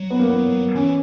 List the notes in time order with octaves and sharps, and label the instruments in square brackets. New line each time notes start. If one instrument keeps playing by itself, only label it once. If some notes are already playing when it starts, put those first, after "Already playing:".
Already playing: [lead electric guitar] F#3
[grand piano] B3
A#3
B3
[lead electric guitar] E3 [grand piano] C#4